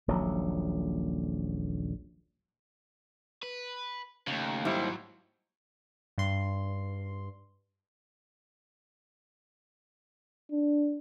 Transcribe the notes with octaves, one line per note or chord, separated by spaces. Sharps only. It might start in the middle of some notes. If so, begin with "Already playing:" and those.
D#1 A#1 F#3
B4
D#2 C#3 A3
G#2 F#3 G3 E4 C5
G2 C6
D4